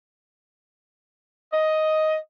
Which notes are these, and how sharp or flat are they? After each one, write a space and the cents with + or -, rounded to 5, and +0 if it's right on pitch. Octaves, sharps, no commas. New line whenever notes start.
D#5 +5